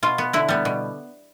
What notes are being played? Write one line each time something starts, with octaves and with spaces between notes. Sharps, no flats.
B2 F4
B3
D3 E4
G3 B3
B2